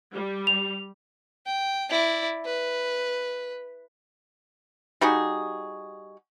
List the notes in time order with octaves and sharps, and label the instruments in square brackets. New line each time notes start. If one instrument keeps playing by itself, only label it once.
[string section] G3
[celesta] F7
[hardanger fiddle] G5
E4 D5
B4
[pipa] G3 D#4 F#4 G#4